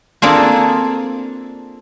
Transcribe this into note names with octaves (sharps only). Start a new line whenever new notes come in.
A#3 C4 D4 F4 G#4 A4